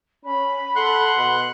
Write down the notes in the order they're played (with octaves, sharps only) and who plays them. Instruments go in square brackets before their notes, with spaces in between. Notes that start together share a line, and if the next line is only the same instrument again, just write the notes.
[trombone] C#4 [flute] B5
[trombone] A4 [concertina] F#5 C6 F#6
[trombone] B2